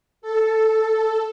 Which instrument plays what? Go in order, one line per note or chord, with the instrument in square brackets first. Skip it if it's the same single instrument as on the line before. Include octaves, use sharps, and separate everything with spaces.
[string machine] A4